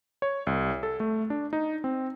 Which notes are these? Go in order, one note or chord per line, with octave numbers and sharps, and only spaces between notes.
C#5
C2
A4
A3
D4
D#4
C4